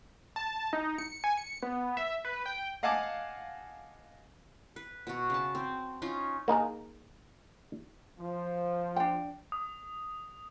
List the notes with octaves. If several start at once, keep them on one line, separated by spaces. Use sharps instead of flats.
A5
D#4
C#7
G#5
C#7
B3
E5
B4
G5
D#5 F5 F#5 G#5 A5 D6
B4
B2 F#4
C#3 A5
C4
C#4 D#4 F4
A#3 D#4 G#4 A#4
F3
D4 G5
D#6